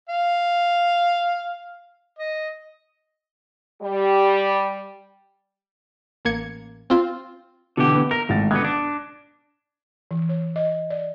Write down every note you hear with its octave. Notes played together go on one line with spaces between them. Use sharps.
F5
D#5
G3
A1 A#3 G#6 C#7
C4 F4
B2 D3 E3 G4
B3
A#4 A#6
G#1 A2 D#3 A6
B2 D3 B3 D#6 F#6 G#6
D4
E3
C#5
D#5
D5